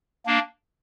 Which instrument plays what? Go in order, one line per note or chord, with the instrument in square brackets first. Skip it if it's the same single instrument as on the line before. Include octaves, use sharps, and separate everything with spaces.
[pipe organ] A#3 D4